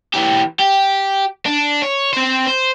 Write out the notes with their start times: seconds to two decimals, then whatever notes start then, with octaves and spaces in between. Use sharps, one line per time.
0.14 E3 G4
0.59 G4
1.46 D4
1.82 C#5
2.13 C4 C5
2.47 C5